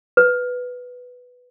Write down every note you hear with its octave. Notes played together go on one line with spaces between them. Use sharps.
B4